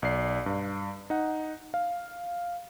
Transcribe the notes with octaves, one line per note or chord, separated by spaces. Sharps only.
B1 D5 C7
G2
D#4 F#5
F5